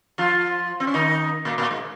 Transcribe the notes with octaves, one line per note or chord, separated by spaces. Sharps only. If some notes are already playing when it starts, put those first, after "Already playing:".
F3 F4
C4
C#4
D#3 D#4
A#2 A#3
A#2 A#3
G#2 G#3